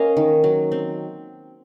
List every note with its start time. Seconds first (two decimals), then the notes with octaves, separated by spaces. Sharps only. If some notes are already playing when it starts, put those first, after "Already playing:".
Already playing: A#3 C#4 A#4 D#5 F5
0.17 D#3
0.44 F#3
0.72 C4